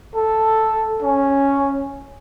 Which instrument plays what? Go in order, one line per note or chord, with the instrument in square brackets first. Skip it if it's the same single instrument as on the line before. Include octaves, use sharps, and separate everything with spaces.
[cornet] A4
C#4